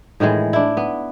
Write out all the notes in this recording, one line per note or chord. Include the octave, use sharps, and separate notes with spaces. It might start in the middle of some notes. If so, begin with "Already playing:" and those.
A2 D#3 E3 G#3
D4 E4
B3